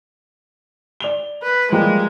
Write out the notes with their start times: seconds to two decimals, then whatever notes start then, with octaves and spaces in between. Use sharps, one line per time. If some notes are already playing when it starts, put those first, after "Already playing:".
1.00 D5 F7 G7
1.43 B4
1.72 F3 G3 G#3 A#3